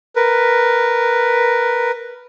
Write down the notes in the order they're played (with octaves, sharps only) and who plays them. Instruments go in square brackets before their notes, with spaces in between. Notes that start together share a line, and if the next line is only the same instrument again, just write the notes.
[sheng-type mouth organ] A#4 B4